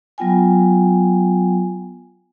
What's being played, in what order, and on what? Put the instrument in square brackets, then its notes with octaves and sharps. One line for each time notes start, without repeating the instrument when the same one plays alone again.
[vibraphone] F#3 B3 F4 G5 G#5